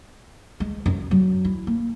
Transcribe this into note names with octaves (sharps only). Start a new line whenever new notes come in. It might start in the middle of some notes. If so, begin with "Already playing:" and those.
G#3
F#2
F#3
E4
A#3